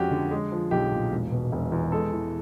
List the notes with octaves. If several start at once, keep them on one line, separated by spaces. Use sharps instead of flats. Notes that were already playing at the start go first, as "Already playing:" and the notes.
Already playing: F2 F3 G#3 C#4 F#4 G4
D3
G#3
F3
B1 G4
A#2
E1
B2
E1
E2
G#3 A4
E3